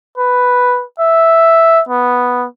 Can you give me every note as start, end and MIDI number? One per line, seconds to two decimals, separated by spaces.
0.18 0.84 71
0.99 1.81 76
1.89 2.46 59